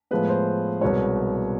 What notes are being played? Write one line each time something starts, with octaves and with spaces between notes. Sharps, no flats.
A2 F3 G#3 B3 B4
C5
C2 B2 G#3 B3 C#5